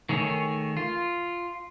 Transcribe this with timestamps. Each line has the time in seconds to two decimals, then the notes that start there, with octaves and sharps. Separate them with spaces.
0.09 D#3 A3 G#4 C#5
0.77 F4